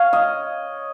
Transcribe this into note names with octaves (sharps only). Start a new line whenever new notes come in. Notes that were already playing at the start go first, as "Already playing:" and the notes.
Already playing: C#5 F5
D#5